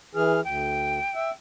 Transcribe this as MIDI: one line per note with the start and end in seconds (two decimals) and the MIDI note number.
0.15 0.40 52
0.15 0.40 68
0.15 0.44 89
0.44 0.99 38
0.44 1.33 79
1.15 1.30 76